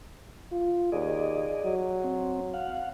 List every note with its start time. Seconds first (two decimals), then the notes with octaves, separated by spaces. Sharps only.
0.51 F4
0.92 D#2 G#4 D5 D#5
1.65 F#3
2.04 C4
2.54 F5 F#5